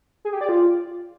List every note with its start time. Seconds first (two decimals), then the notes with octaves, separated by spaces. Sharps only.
0.25 G#4
0.33 G4
0.41 D5
0.49 F4